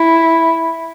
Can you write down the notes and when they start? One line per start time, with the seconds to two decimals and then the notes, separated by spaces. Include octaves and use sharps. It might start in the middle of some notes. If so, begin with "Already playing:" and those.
Already playing: E4